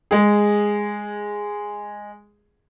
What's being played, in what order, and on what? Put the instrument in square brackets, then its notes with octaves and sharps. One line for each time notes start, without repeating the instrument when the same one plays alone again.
[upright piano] G#3 G#4